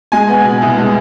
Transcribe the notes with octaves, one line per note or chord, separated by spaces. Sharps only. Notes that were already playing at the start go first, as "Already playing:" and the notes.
G#3 G#5
B3
B2
C2
G#3